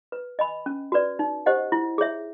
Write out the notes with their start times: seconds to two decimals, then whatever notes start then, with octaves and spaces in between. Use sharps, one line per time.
0.12 B4
0.39 D#5 G#5 B5
0.66 C#4
0.92 F#4 B4 D5
1.19 D#4
1.46 G4 C5 D#5 F#5
1.72 E4
1.98 G#4 C#5 E5